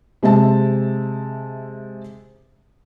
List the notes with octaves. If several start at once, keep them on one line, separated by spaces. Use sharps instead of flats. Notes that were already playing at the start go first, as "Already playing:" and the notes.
C3 G#3 C4 E5 A5